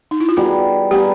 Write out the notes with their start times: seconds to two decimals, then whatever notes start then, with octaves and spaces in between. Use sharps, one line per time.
0.11 D#4
0.20 E4
0.29 F4
0.37 G3 B3 D#4 F#4 G#4
0.91 G3 B3 D#4 G4 G#4